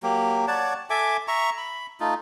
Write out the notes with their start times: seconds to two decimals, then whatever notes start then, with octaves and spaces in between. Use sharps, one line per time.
0.03 F#3 A#3 G4
0.48 C#5 D5 F#5 A5
0.90 A4 E5 G#5 D6
1.28 E5 A#5 C#6
1.57 B5
2.00 A3 D#4 F4